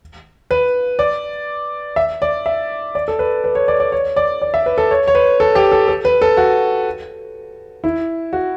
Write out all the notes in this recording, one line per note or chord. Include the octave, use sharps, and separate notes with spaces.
B4
D5
E5
D5
E5
D5
A4
B4
B4
C#5
D5
D5
C#5
D5
D5
E5
B4
A4
C#5
C#5
B4
A4
G4
A4
A4
B4
A4
F#4
E4
F#4